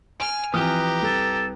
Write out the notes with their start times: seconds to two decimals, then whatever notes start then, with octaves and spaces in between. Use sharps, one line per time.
0.20 G#5 F6 D7
0.54 E3 F3 C4 G4 B4 A#5 D#6 F6
1.02 C2 A4